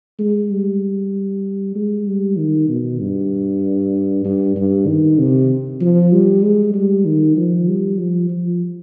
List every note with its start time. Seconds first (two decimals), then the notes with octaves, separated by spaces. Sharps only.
0.19 G#3
0.50 G3
1.75 G#3
2.07 G3
2.38 D#3
2.69 B2
3.00 G2
4.25 G2
4.56 G2
4.87 D#3
5.18 C3
5.81 F3
6.13 G3
6.43 G#3
6.74 G3
7.05 D#3
7.37 F3
7.68 G3
7.99 F3
8.30 F3